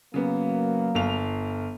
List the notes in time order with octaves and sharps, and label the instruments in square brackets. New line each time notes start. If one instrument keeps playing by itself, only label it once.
[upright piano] C#3 B3 [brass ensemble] F#3 A#3
[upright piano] G1 F5 F7